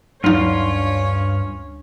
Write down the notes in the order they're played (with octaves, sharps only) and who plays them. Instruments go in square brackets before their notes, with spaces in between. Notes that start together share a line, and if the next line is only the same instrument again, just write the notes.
[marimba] D2 [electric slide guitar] G2 F4 [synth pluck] F#3 D#4 [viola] C#4 C#5